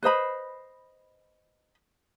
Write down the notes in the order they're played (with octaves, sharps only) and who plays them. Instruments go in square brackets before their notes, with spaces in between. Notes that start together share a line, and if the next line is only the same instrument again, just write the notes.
[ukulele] B4 C5 D#5 B5